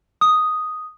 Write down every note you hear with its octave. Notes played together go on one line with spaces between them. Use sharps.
D#6